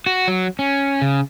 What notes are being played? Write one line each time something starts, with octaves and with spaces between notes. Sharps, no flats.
F#4
F#3
C#4
C#3